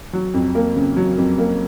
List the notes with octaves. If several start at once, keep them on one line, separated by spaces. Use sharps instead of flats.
F#3
F2
A#3
C#3
F#3
F2
A#3